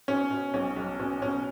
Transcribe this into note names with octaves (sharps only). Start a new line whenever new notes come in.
B2 C#4
B2
B1 C#4
B1
B2 C#4
B2 C#4